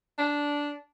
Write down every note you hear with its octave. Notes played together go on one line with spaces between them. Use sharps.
D4